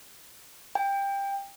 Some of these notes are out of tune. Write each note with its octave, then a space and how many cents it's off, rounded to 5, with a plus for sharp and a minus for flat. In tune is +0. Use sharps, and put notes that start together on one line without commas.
G5 +20